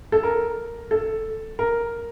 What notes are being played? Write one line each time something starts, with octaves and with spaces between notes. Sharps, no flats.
A4
A#4
A4
A#4